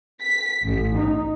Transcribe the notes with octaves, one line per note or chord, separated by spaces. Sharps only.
B6
A1
D#4